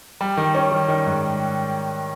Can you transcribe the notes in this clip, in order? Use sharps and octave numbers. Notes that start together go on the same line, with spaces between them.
G3
D#3
C#4
D#3
D#3
G#2